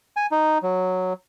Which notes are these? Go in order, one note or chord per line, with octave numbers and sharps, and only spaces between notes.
G#5
D#4
F#3